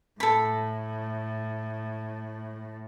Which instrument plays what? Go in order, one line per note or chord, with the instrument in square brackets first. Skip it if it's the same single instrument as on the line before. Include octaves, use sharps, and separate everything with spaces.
[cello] A2 [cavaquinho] A4 B5